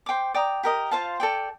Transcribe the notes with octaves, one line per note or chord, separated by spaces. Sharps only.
C5 G5 D6
D5 G5 A#5 D#6
G4 A#4 D#5
F4 C5 F5 A5
A4 D5 G5